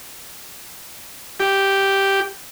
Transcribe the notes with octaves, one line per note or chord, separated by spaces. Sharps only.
G4